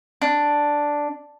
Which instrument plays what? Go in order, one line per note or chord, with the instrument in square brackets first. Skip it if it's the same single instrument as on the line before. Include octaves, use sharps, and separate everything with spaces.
[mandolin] D4